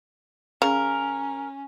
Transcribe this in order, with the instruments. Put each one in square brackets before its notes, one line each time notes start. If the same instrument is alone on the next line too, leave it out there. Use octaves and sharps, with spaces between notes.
[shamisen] C#3 [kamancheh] C#4 [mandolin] A#4